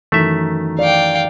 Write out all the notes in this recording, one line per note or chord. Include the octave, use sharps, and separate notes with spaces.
F#2 D#3 E3 A3 E5
D5 F5 G5